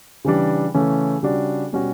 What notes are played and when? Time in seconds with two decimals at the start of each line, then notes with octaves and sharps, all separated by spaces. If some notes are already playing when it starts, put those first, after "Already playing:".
0.25 C#3 E3 G3 D4
0.74 C#3 E3 A3 C#4
1.23 C#3 G3 D4 F#4
1.73 B2 G3 C#4 F#4